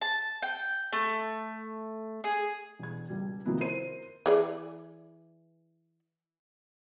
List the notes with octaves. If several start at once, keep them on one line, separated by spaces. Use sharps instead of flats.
A5
G5
A3
G#4
E1 G#6
C#2 G3
C3 D#3 F3 B3 E4 F#4
A#4 C5 C7 D#7
E3 G#4 D5